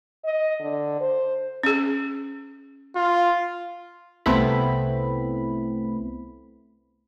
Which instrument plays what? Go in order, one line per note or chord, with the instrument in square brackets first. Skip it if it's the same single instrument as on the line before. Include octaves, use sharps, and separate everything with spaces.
[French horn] D#5
D3
C5
[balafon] C#4 G#4
[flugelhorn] F4
[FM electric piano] C2 A3 B3 C4 E4 B5